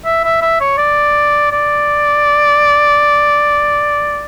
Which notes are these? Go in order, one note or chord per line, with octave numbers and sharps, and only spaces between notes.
E5
E5
E5
C#5
D5
D5